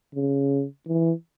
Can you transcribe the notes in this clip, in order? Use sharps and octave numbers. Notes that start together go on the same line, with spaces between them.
C#3
E3